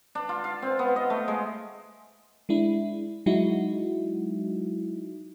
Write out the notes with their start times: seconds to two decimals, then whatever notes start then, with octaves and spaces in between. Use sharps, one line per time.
0.15 D4
0.29 F4
0.44 F5
0.62 C4
0.79 B3
0.96 D#5
1.10 A3
1.28 G#3
2.49 G#3 D4 E4
3.26 F#3 G#3 D#4 E4 F#4